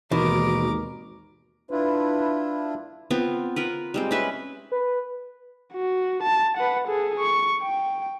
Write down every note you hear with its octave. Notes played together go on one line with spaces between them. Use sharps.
G#1 D#2 B2 E3 D#4 A#4 D6
D4 E4 F4 B4
B3 C4 F4
F4 A#4 B4
G3 G#3 C4
C#4 B4 E5
B4
F#4
A5
B4 F#5
G#4 A4
C#6
G5